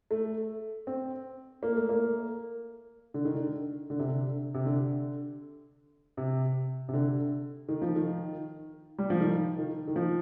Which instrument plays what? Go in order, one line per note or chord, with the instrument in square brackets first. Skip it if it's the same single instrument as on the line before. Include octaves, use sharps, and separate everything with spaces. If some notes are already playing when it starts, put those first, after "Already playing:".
[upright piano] A3
C4
A#3
A3
A#3
D3
D#3
D3
D3
C3
D3
C3
D3
C3
C3
D3
D#3
F3
D#3
G3
F3
D#3
D#3
D#3
F3